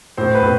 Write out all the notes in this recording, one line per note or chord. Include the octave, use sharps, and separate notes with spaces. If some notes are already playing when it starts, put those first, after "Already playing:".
A2 C5
B4
A2